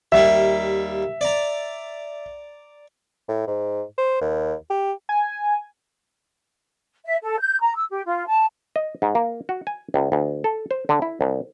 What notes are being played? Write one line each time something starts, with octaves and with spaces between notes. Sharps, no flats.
D#2 G3 A#3 E5
D5 A#5
A2
G#2
C5
D#2
G4
G#5
E5
A4
G6
A#5
E6
G4
F4
A5
D#5
G#2
A#3
F#4
G#5
C#2
D2
A4
C5
D3
E4
C2